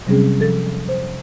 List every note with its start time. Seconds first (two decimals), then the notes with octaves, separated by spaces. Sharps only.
0.07 C3 F#3 G3 C4 C#4 G#4
0.40 F3 A4 A6
0.88 C5